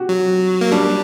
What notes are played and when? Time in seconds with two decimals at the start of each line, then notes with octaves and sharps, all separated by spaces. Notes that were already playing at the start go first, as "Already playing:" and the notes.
Already playing: F#4 G4
0.09 F#3
0.61 A#3
0.72 G3 D4